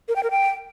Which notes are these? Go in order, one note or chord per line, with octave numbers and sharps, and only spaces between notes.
A#4
G5
A#4
G5